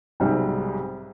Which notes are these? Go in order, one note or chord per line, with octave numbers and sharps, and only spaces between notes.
B1 G#2 C3 G3